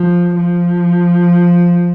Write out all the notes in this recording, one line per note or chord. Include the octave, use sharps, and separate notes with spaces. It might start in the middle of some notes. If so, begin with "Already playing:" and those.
Already playing: F3
F3